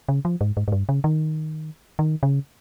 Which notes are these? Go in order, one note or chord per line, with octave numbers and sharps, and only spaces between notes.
C#3
F3
G#2
G#2
G#2
G2
C#3
D#3
D#3
C#3